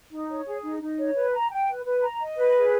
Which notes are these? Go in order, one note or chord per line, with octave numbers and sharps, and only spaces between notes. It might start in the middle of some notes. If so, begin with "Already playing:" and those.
D#4
C#5
G#4
D#4
D#4
C#5
B4
A#5
G5
B4
B4
A#5
D#5
B4
G#4